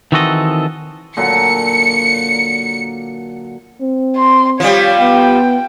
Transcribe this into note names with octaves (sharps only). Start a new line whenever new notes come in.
D#3 E3 C4 F#4 A4 D#5
A#2 D3 F#3 C#7
C4
C6
F3 G3 C#5
B3 G5